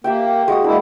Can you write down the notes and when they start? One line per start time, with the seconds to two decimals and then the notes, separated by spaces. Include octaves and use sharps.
0.04 A#3 G4 E5 G5
0.48 G#3 F#4 D#6
0.64 G#3 A#3 D4 E4